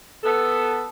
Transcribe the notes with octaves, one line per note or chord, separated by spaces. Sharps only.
B3 A4